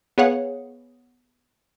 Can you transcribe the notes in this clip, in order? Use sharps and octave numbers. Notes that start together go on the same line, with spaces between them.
B3 G#4 C#5 F5 F#5